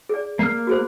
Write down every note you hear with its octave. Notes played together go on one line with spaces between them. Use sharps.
G#4 D5
A#3 F6
F#4 G#4 C5